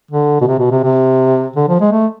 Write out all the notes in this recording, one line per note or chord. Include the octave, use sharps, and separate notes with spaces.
D3
B2
C3
B2
C3
C3
D3
F3
G#3
A3